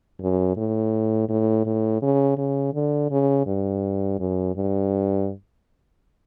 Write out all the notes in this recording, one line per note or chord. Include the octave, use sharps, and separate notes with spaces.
F#2
A2
A2
A2
C#3
C#3
D3
C#3
G2
F#2
G2